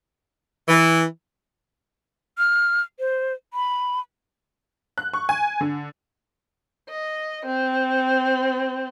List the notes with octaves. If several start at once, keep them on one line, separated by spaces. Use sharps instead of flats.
E3
F6
C5
B5
F#6
C#6
G#5
D3
D#5
C4